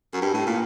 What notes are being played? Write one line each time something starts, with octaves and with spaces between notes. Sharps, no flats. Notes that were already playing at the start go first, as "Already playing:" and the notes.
F#2
G2
A2
A#2